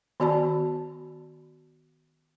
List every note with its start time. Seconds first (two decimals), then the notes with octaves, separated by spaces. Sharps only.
0.20 D#3 B3 F#4 D5 A5 B5